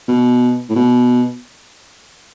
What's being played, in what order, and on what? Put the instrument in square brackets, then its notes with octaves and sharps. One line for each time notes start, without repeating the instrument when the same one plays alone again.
[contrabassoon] B2
A2
B2